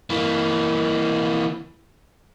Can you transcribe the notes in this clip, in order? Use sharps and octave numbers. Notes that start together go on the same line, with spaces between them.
E3 A#3